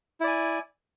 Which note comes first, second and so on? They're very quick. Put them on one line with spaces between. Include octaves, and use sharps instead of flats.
E4 D5 G#5